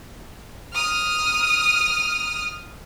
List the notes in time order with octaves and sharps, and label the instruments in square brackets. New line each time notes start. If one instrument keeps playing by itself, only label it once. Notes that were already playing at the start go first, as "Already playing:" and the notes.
[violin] D#6 F6